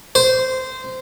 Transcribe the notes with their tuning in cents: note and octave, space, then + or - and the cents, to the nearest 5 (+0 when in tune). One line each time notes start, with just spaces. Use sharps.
C5 -15